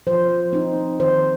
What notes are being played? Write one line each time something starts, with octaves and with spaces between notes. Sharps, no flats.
F3 C5
C4 D#4
D#3 C5